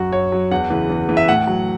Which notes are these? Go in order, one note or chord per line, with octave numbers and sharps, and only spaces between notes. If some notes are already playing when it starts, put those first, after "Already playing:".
Already playing: F#2 F#3 F#4
F#2 C#5
F#3
E2 F#5
C#3 E3
E2
C#3 E3
E5
A2 F#5
F#3